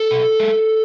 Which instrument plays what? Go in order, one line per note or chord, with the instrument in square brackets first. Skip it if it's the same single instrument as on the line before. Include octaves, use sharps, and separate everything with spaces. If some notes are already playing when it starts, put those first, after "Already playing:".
Already playing: [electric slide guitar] A4
B2
G#3